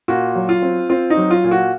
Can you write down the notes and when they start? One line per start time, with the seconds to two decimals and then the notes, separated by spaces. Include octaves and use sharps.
0.08 A#2 F#4
0.35 F#3
0.49 F4
0.62 C4
0.90 C4 F4
1.10 D#4
1.17 F#3
1.30 F4
1.44 A#2
1.51 F#4